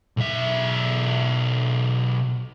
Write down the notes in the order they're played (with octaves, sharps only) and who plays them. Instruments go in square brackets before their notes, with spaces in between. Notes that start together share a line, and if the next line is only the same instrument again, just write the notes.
[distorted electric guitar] B1 E5